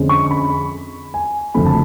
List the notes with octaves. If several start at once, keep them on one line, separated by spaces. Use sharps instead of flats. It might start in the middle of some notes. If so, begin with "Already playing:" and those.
Already playing: F2 D3 G#3 C#4
C#6
B5
G#5
F#1 F2 D3 F3 A3 B5
A5